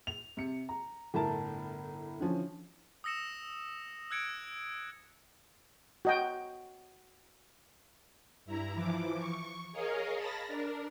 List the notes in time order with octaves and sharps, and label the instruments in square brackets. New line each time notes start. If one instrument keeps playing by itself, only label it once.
[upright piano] F7
C3 C#7
A#5
G1 A2 E4 A#4 A5
D3 E3 F3 C#4
[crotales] D#6 E6 A#6 C#7 E7
E6 F#6 G#6 C#7 D7
[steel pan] F#4 D#5 G5
[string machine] G2 E4 A#5
E3 F3 D6
C#6
G#4 A#4 C#5 D#5 F5
A5 B5 A6 A#6
D4 A#4